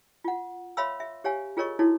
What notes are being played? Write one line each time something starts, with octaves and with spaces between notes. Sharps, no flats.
F4 F#5
C#5 E5 F5 B5 C6 E6
E5
G4 C#5 F5 G#5
F4 G#4 A#4 C#5 D#5 C#6
D#4 E4 F#4 A4 C#5